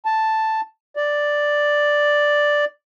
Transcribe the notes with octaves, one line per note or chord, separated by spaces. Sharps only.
A5
D5